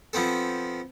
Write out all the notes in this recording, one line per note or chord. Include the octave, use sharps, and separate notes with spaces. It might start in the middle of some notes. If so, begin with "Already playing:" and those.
F3 B3 C4 A4